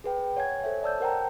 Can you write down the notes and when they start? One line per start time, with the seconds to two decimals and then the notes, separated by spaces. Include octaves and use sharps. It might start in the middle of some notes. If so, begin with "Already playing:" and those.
0.04 G#4 B4 G5
0.37 C#5 F#5 G#5 G#6
0.64 A4 C5 C#5 E5
0.83 D5 A5 E6 G6
1.00 A#4 C5 F#5 G5 A5 A#5